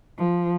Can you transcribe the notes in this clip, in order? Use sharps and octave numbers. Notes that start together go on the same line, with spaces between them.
F3